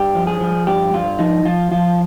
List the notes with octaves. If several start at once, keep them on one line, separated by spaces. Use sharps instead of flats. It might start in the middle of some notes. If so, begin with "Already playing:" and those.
Already playing: G2 G4
F3
G#4
F3
G2 G4
G2 F4
F3 D#4
F3 F4
F3 F4